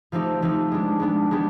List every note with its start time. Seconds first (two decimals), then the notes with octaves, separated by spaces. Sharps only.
0.12 F3 A3 C4 D#4 G4
0.42 F3 A3 C4 D#4 G4
0.72 G#3 B3 D4
1.00 G#3 B3 D4
1.31 G#3 B3 D4 G4